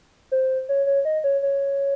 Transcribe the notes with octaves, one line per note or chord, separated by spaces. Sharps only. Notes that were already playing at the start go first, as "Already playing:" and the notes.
C5
C#5
C#5
D#5
C#5
C#5